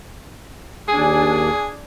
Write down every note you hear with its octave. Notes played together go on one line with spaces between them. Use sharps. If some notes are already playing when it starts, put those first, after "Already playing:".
D#2 D4 G#4 G#5